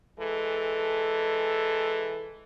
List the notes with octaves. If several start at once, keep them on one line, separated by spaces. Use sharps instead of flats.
E3 G#3 A4